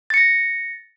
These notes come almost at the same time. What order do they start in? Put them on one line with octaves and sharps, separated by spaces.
A6 C#7 A#6